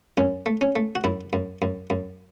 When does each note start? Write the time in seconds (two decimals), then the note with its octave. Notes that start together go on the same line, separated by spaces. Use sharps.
0.17 F#2 C#4
0.46 A3
0.61 C#4
0.76 A3
0.95 F#4
1.04 F#2 E4
1.33 F#2
1.62 F#2
1.90 F#2